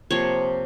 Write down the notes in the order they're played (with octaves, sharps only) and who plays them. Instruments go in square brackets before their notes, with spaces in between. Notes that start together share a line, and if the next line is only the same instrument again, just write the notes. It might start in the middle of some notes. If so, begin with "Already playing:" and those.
[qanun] C3 F3 A#3 C#5